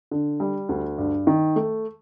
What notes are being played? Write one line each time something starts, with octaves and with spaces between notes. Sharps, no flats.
D3
G3
D2
G2
D#3
A3